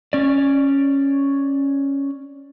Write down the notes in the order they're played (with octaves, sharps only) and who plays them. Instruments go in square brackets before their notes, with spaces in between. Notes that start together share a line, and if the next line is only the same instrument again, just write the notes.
[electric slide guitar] C#4 D5